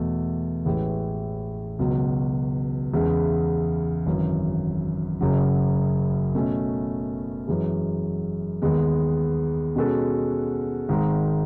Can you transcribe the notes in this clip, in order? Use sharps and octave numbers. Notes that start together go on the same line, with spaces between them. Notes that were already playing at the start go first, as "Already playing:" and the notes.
Already playing: E2 B2 A3
A1 A2 E3 G#3
C#2 B2 F#3
E2 C#3 G#3
G#1 F#2 E3
F#1 F#2 C#3 F#3
B2 A3 C#4
F#2 E3 G#3
D#2 D#3 G#3 B3
B2 G#3 C#4 F#4 A4
G#1 G#2 D#3